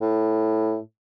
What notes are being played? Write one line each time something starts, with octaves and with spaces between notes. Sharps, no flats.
A2